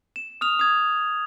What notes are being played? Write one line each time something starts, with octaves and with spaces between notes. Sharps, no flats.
E7
D#6 F6 F7
D#6 G#6